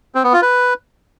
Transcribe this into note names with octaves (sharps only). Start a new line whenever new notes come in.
C4
B3
F4
B4